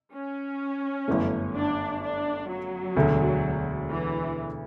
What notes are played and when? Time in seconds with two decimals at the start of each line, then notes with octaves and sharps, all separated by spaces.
0.13 C#4
1.08 G1 F#2 E3 A3
1.55 D4
2.01 D4
2.48 F#3
2.96 E1 D2 D3
3.89 E3